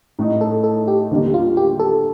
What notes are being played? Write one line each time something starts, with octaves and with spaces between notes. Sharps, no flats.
A2 A3 D#4
A4
A4
G4
D#2 D3 G3 A#3 D4
F4
G4
A4